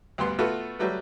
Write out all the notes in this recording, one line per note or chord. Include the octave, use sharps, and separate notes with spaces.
D2 G2 B3 C6
A3 B3 F4 F#4 A4 B4
F#3 G3 A3 B4